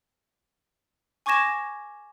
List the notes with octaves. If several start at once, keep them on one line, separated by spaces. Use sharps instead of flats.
G#5 C#6 D6 G#6 A#6 E7